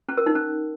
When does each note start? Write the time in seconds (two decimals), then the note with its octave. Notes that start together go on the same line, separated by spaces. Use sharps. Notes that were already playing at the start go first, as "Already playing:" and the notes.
0.09 C#4
0.17 A#4
0.26 D#4
0.35 C#4